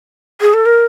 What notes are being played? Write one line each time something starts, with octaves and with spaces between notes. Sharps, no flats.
G#4
A4
A#4